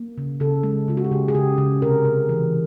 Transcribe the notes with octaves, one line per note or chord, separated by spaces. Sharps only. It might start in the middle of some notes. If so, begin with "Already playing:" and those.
Already playing: A#3
C#3
C#3 A4
G#3
C#3 F4
F#4
G4
C#3 G#4
G#4
C#3 G4
C#3
C3 A#4
C3
E3